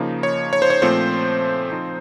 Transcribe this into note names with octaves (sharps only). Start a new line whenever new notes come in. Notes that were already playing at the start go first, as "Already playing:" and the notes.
Already playing: C#3 F3 A#3 D#4
C#5
C#5
C5
C#5
A#2 F3 A3 C4 C5
F3 C4 D#4